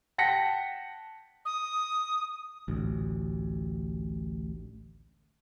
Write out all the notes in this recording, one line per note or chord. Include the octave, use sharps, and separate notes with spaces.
F#5 G5 A5 A#6 B6 C#7
D#6
A1 D2